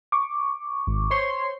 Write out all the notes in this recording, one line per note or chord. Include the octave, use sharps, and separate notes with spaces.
C#6 D6
G#1
C5 C#5 C6